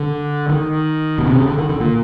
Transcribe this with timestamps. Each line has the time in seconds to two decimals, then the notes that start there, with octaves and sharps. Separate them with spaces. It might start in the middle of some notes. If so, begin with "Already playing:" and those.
Already playing: D3
0.49 D#3
1.18 B2
1.26 C3
1.37 C#3
1.47 D3
1.58 D#3
1.70 D3
1.80 A#2